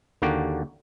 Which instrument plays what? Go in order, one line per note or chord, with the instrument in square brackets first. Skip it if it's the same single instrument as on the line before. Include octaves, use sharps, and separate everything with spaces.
[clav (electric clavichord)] D#2 D3 A#3 F#4 G4 D5